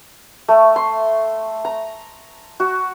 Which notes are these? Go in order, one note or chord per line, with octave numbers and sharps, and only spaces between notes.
A3
C6
A#5
F#4